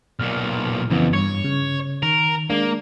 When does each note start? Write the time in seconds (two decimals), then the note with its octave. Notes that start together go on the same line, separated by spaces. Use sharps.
0.19 B1 A#2 F6
0.90 F2 C#3 E3 B3
1.13 G2 C#5
1.45 C#3
2.03 D#3 A#4
2.50 G#3 A#3 D4